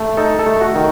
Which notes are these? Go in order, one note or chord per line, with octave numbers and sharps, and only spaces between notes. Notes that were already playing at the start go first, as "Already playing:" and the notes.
Already playing: A3
D#4 A4
A4
A3
F#4
D#3